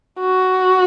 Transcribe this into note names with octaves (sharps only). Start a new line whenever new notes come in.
F#4